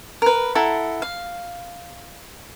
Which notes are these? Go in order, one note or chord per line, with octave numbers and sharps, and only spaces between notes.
A#4 B4
E4 A4 F#5 A#5
F5